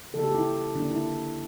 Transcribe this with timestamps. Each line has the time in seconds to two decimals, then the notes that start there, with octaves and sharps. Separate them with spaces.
0.13 C#3 F3 A#3 A4
0.24 G4
0.34 E4
0.75 D3 F3 A#3 D4
0.91 E4